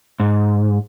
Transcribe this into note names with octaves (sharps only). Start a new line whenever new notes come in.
G#2